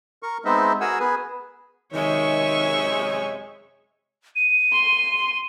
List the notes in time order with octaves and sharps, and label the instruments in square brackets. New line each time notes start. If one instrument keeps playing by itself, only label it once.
[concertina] A#4 C#6
G#3 B3 C4 D#4 D#5 E5
F#4 G#4 A#4 F#5 G#5 E6
B3 G#4 B4 G#5
[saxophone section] F#2 C3 G#3 [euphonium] D#3 [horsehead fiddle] C#5 G#5 [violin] E5 C#6
[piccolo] D#7
[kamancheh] C6